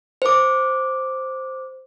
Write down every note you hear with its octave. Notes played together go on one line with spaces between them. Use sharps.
C5 D6